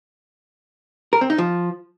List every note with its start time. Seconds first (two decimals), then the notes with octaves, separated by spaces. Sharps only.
1.13 A#4
1.21 C4
1.30 D#4
1.38 F3